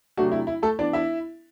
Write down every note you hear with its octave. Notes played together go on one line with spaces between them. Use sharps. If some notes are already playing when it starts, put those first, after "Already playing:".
C3 F#3 A3 D4 F#4
E4
E4
A3 A4
E3 B3 D4 D5
E4 E5